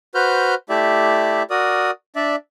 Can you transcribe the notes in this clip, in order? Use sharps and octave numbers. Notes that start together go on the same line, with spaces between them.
F#4 B4 C5 F6 G6
A3 E4 G4 D5 E5
F#4 A#4 D5 D#6
D4 D5 E5